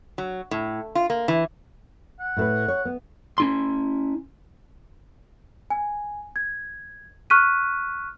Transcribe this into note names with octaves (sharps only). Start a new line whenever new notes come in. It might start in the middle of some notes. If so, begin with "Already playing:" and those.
F#3
A2
F4
A#3
E3
F#5
A2 A4 B4
C#5
B3
C#4 E4 C6
G#5
G#6
C#6 F6 F#6 B6 D#7